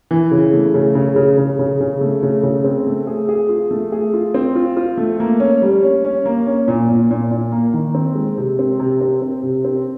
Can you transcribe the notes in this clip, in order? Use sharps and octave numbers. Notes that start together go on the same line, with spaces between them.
E3
C#3
A3
C#3
C#3
C#3
C#3
C#3
C#3
A3
C#3
C#3
C4
A3
G#4
G#4
F4
A3
G#4
F4
C4
F4
F4
A3
A#3
C#4
G3
C#4
C#4
A#3
C#4
A#2
A#2
A#2
A#2
A#3
D#3
C4
G#3
C3
C4
C3
C4
C4
C3
C4